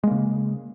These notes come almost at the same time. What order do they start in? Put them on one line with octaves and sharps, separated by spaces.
G#3 A#3 C#3